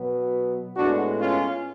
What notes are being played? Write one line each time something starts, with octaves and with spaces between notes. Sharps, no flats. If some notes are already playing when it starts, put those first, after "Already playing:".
Already playing: B2 F#3 B3
A2 G#3 B3 D4 F#4
C#4 F4